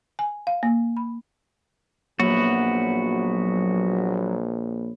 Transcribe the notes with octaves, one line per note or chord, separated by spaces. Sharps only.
G#5
F5
A#3
B5
A#1 F#3 A#3 B3 F#4 C#5 B5